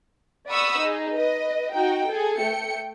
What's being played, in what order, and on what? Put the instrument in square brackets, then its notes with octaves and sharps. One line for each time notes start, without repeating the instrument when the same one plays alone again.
[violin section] D5 F#5 B5 C#6 D#6 E6
D#4 G#4
B4 D#5
D#4 F#4 G5
G#4 A4
A3 G5 C#7